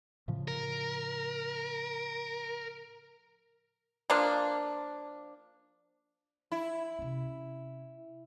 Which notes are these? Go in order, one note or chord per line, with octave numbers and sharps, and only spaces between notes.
A2 C#3 F3
A#4
F3 A#3 D4
E4
C3 C#4